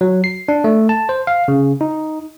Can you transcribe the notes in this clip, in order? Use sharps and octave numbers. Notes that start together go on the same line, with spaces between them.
F#3
C7
D4
A3
A5
C5
F5
C#3
D#4